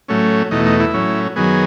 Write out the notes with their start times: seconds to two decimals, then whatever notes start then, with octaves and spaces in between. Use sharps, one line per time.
0.08 A2 F#3 A3 C#4
0.51 E2 B2 A3 D#4
0.66 D#4
0.80 E4
0.94 A2 F#3 C#4
1.36 F#2 D#3 F#3 B3 G#4